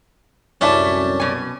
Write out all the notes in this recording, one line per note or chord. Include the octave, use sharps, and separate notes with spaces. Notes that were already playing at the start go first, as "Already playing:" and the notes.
C2 F#2 A2 C#4 D4 E5 A5
B2 G#5